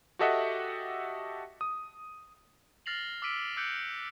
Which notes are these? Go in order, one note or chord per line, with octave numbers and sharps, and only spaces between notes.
F#4 G4 A4 D#5 E5 F#5
D#6
F6 A6 A#6 C7 F7 F#7
D6 E6 F6 B6 D7 D#7
D6 E6 F#6 G6 C#7 D7